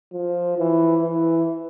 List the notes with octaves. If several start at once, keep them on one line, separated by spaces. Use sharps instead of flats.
F3
E3
E3